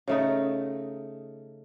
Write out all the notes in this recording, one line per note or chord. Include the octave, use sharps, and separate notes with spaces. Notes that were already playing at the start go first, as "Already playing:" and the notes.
C#3 A3 D#4